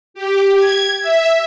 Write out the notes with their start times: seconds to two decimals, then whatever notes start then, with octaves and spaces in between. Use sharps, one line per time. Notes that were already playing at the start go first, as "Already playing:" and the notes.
0.14 G4
0.55 G#6
1.01 E5